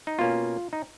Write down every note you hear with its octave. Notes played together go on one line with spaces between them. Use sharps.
D#4
B2 A#3 C#4 F4
D#4